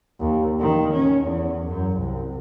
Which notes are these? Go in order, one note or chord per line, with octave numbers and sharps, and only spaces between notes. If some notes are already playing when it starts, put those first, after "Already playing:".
D#2
D#3
C#4
E2
F#2
C2